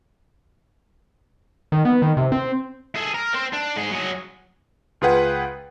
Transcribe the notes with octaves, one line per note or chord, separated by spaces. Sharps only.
D#3
B3
D#3
C3
C4
G#4 A4
A#4
C4 C5
D4
G#2 G#4
F#3 G#4
C#2 F4 G#4 B4 F#5 G5